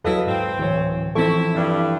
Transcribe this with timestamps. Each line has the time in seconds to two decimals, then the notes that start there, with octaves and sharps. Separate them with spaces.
0.04 D#2 F#3 E4 A4 B4 D#5 F5
0.27 G#2 C4
0.59 D1 A2 E3 C#5
1.15 E3 F3 C4 E4 A4 C#6
1.55 G2 E4